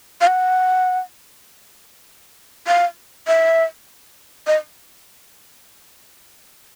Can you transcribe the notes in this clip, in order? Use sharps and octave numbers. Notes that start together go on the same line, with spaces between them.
F5
F#5
F5
E5
D#5